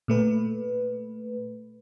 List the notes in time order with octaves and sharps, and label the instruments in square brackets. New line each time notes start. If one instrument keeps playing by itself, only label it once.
[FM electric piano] A#2 A3 B4